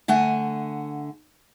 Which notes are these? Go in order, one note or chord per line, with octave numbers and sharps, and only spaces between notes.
D3 A3 F#5 G#5